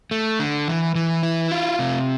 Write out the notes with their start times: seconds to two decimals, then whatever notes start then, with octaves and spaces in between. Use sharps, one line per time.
0.11 A3
0.40 D3
0.68 E3
0.95 E3
1.23 E4
1.52 F4
1.79 C3